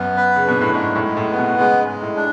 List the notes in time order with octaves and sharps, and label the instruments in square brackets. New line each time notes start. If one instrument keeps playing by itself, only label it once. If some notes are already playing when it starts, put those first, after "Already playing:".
Already playing: [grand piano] F#2 [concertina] B3
[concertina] B4
[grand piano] C#3
[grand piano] B2 [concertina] D4
[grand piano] A2
[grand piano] G#2 [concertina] G#3
[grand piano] A2
[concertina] G#3
[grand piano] A2
[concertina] B3
[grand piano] B2
[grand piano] C#3 [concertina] G#3
[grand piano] G#2
[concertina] G#3
[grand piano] A2
[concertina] D4